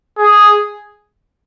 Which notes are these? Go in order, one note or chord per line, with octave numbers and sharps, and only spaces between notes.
G#4